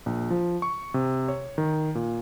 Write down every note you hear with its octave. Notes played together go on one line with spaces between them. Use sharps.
A#1
F3
C#6
C3
C#5
D#3
A#2